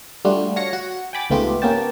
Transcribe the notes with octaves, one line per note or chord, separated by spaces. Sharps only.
G3 A3 D4 F4 F#4
F#4 C#5 F5 A#6 C#7
F#4
G5 G#5 B5 D6 A6
C#2 G#2 A3 B3 F4 G4
A#3 B3 C#4 G4 G5 A5